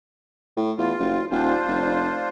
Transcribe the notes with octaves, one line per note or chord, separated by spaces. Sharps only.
A2
E2 F4
F#1
D#1 D4 F4 C5
F1